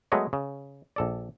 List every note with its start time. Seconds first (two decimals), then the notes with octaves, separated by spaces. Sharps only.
0.12 F#3 G#3 A3 B3 C#5 D#5
0.33 C#3
0.96 A#1 A4 D5